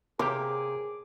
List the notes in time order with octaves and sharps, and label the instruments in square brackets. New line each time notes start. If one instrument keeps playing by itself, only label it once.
[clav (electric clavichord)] C3 A#3 G4 [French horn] G#4 [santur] D6